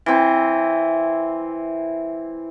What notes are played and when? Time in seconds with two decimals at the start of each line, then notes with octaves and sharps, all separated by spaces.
0.06 E3 C4